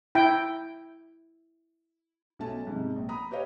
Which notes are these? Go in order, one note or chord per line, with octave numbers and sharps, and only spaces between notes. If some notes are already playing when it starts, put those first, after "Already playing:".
E4 G5
B1 A3 C#4 A5
G#2 C3
A#1
A#5 B5 D#6
G4 B4 C#5 D#5 F5